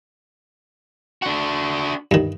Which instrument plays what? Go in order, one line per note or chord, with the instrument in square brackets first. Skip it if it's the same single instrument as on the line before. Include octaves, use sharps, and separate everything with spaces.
[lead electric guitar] D4 F#4
[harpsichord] G2 D#3